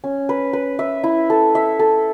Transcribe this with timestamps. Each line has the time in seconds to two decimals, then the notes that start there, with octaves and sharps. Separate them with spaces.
0.04 C#4
0.29 B4
0.53 B4
0.79 E5
1.04 E4
1.30 A4
1.55 E5
1.79 A4